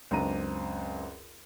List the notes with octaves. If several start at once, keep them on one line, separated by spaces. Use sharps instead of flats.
C#2 F#2 C4 D4 A#5 D#7